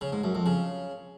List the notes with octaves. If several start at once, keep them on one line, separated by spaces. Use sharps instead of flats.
C#3
G#2
F#2
F2
C#3